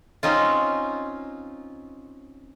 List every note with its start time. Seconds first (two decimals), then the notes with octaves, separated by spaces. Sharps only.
0.23 C4 C#4 D#4 F4